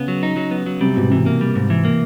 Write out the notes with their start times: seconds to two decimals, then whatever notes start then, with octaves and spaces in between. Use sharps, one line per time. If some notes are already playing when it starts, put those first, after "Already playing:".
Already playing: C#3 B3
0.08 F#3
0.23 D#4
0.36 F#3
0.51 B3
0.66 F#3
0.81 C3 G3
0.96 G#2 B2
1.10 C3 E3
1.26 A#3
1.41 G3
1.55 G#2
1.70 E3
1.85 A#3